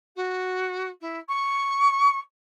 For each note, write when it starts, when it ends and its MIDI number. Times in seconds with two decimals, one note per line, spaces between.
0.16 0.89 66
1.00 1.18 64
1.28 2.19 85